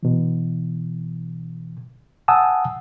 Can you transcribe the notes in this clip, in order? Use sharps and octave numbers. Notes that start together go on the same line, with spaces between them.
B2 E3
F#5 G#5 A5 D#6 E6